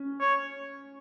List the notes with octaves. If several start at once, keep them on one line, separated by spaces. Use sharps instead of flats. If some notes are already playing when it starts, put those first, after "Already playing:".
Already playing: C#4
C#5